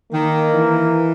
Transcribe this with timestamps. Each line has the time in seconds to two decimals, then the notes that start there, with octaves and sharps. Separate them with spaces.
0.12 D#3 A#3
0.54 E3